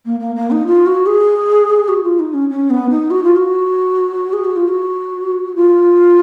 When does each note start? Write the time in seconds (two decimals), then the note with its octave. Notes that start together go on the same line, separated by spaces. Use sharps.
0.05 A#3
0.20 A#3
0.35 A#3
0.51 D#4
0.67 F4
0.86 F#4
1.06 G#4
1.88 F#4
2.03 F4
2.19 D#4
2.34 C#4
2.50 C#4
2.70 B3
2.90 D#4
3.10 F#4
3.24 F4
3.36 F#4
4.33 G#4
4.44 F#4
4.56 F4
4.68 F#4
5.55 F4